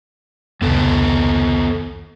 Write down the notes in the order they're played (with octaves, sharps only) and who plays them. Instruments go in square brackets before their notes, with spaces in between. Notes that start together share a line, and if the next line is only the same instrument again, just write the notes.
[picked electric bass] F1 C#2 [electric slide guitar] D#3 B3 A4